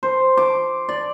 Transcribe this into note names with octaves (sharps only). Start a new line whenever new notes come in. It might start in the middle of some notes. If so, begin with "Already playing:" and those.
C5
D6
D5